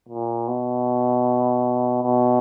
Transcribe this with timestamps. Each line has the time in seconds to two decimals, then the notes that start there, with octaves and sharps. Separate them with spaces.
0.09 A#2
0.48 B2
2.03 B2